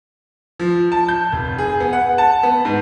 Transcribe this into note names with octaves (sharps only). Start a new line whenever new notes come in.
F3
A5
G6
F1
G#4
B3
F#5
A5
B3
G#2